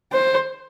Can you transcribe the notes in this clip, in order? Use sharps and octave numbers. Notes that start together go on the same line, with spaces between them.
C5